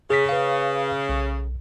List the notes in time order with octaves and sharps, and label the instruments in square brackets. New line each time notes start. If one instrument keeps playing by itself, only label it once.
[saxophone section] C#3 [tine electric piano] G#4 B6
[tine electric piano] B4 F5
B1